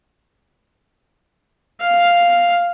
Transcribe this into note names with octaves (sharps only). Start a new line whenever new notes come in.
F5